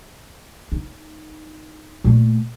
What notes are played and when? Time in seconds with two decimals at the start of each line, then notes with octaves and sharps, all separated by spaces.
0.72 D#4
2.04 A#2 A3